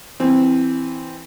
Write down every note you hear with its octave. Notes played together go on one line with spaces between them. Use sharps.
E3 C4